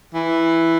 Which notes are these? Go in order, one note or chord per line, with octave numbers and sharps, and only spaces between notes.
E3